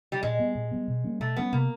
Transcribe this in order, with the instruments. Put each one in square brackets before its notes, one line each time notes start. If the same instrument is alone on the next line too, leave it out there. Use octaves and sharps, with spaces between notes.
[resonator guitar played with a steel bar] G3
[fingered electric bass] A#2 [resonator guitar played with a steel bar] G#3
[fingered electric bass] G3 B3
A#2
G3 B3
B2
G3 A#3 C#4
[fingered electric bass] B2 [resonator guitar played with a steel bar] A3
[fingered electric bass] G3 A#3 C#4 [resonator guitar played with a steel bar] B3
[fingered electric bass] C3 [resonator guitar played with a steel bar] A#3